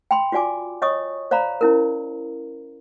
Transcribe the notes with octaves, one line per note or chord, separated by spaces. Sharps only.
G5 B5 C6
F4 F#4 D5 G#5 D6
C#5 D#5 C#6 D#6
C5 D5 F5 A#5 B5
C#4 E4 A#4